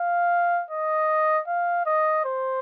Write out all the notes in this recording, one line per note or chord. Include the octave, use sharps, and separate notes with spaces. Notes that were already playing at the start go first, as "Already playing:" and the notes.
Already playing: F5
D#5
F5
D#5
C5